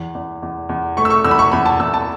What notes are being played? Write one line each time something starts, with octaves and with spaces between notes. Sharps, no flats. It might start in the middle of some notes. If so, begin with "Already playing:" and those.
Already playing: E2 E3
E2
E2
E2
A3 C#6
E6
C#6
E2 E6
B5
C#6
E2 B5
A5
E2 E6
A5